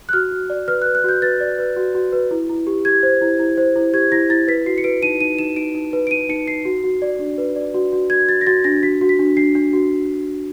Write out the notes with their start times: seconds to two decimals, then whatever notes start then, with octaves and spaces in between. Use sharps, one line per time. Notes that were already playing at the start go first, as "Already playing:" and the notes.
0.09 F#6
0.13 F#4 F6
0.31 F#4
0.50 D5
0.68 B4 F6
0.82 F#6
0.86 B4
0.95 F#6
1.04 F#4 G6
1.22 B4 A6
1.41 D5
1.59 B4
1.77 F#4
1.95 F#4
2.13 B4
2.31 E4
2.49 E4
2.67 G4
2.85 G4 G#6
3.03 C5
3.21 E4
3.39 E4
3.57 C5
3.76 E4
3.94 G4 G#6
4.12 E4 A#6
4.30 E4 A6
4.48 B4 B6
4.66 F#4 C7
4.78 C#7
4.84 B4 D7
5.02 D#4 D#7
5.21 D#4 D#7
5.39 D#4 E7
5.56 D#4 D7
5.75 D#4
5.93 B4
6.07 D7
6.11 D#4 D#7
6.29 D#4 C#7
6.47 D#4 C7
6.65 F#4
6.84 F#4
7.02 D5
7.19 D4
7.38 B4
7.56 D5
7.74 F#4
7.92 F#4
8.10 F#4 G#6
8.28 F#4 A6
8.41 A#6
8.46 F#4 A6
8.64 D4 A#6
8.82 F#4 B6
9.01 F#4
9.09 B6
9.19 D4
9.37 D4 C7
9.55 D4
9.73 F#4